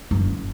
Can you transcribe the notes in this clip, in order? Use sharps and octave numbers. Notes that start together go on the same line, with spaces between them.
F#1